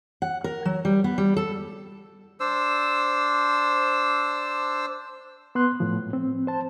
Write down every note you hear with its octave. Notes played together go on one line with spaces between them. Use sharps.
F#5
A#4
F#3
G3
B3
G3
A4
D4 C5 E6
B3 C6 F#6
A2 F3
C4
C5 A5